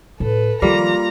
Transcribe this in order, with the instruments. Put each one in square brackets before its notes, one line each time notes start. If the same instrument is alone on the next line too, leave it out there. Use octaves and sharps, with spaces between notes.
[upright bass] A2 [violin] A4 B4
[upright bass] D#3 F3 [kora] G3 A#3 [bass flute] F4 [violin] A#5